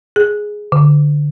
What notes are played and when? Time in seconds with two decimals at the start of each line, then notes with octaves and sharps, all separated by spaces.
0.16 G#4
0.72 D3